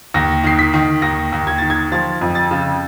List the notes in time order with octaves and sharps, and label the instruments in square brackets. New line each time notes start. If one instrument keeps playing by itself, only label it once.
[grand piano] D#2 A#6
D#3 C7
B6
D#3
D#2 A#6
D#2
G#6
D#3 A6
G#6
F3 A6
F2
A6
C#3